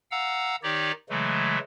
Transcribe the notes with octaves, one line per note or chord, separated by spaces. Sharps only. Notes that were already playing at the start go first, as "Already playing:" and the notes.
F5 F#5 A#5 E6
D#3 D#4 G4 C#5 D5
C#3 E3 F#3 G#3 A3